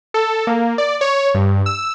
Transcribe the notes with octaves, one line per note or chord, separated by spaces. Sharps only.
A4
A#3
D5
C#5
G2
E6